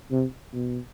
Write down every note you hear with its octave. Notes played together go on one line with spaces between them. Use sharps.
C3
B2